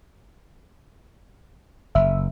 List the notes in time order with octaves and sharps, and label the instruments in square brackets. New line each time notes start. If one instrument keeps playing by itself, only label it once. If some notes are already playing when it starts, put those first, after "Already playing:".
[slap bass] F#1 [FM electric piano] E5